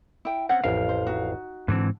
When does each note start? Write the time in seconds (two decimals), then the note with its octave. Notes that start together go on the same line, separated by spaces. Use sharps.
0.25 E4 G5
0.49 C4 C#4 F#5
0.64 A1 F2 A#4 F5
0.89 C5
1.07 D#4 F#4
1.68 G#2 D3 E3 C4